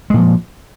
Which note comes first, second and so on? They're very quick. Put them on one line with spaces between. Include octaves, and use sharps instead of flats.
G#3 A#2 F3